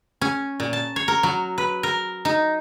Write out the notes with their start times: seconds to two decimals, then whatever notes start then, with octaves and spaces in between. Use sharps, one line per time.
0.21 C#4
0.60 A#2
0.73 A5
0.96 C#5
1.08 A#4
1.23 F#3
1.58 B4
1.83 A#4
2.25 D#4